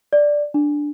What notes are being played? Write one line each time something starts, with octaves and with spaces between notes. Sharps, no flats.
D5
D4